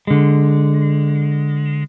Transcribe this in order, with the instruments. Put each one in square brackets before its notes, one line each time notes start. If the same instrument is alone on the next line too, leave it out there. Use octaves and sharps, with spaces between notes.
[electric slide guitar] D3 G#3